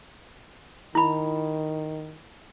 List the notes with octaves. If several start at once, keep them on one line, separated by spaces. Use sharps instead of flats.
D#3 E4 B5